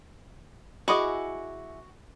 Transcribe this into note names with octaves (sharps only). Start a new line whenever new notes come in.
E4 F#4 G#4 D#5 C#6 D6